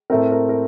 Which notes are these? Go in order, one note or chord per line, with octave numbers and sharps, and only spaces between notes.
A2 A3 C4 A#4
A#4
A#4